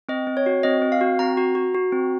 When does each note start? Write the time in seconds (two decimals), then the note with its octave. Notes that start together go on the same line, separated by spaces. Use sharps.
0.09 C4 D#5
0.27 C4
0.37 C#5
0.46 F#4
0.63 C4 D#5
0.82 C4
0.92 F5
1.01 F#4
1.19 C4 A#5
1.37 F#4
1.55 F#4
1.74 F#4
1.92 C4